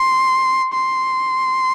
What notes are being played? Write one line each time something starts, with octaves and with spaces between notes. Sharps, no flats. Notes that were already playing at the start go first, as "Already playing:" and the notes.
Already playing: C6
C6